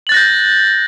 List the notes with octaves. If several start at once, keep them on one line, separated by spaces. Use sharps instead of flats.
F#6 G6 A6 A#6 F#7